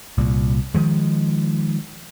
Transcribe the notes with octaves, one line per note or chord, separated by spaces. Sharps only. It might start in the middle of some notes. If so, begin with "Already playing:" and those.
C2 A#2
D#3 F3 G#3